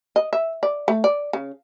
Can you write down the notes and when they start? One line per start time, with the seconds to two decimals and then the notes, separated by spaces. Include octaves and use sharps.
0.16 D#5
0.33 E5
0.63 D5
0.88 A3
1.04 D5
1.33 C#3